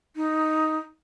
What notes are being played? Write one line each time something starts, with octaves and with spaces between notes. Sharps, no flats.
D#4